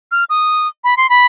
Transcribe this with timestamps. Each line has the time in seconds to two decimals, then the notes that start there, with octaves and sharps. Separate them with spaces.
0.12 F6
0.30 D#6
0.84 B5
0.97 C6
1.09 B5